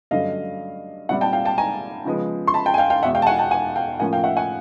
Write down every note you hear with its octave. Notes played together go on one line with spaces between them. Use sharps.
G2 D3 F#3 A3 C#4 D#5 F5
A#2 G3 C4 E5 F#5
G5 A5
F5 G5
G5 A5
G#5 A#5
C#3 F3 G#3 B3
C6
A5 B5
G5 A5
G#5
F5 G5
F5 G5
E2 B2 G#3 E5 F#5
F5 G5
A5
F#5 G#5
G5 A5
F#5 G#5
F5 G5
A2 F3 A#3 C#4 F#5 G#5
F5 G5
E5 F#5
F#5 G#5